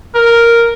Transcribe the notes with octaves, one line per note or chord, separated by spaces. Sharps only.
A#4